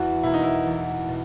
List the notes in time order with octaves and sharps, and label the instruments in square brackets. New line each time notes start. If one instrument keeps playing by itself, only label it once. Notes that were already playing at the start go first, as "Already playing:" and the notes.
Already playing: [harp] E2 [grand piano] F#4
[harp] B2 A#3 [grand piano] E4
[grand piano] D#4
E4
[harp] E2
B2